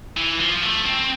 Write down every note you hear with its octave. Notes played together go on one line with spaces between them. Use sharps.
E3
F3
A3
C4